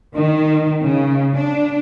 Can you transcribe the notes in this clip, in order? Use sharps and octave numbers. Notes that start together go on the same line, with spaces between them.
D#3
C#3
D4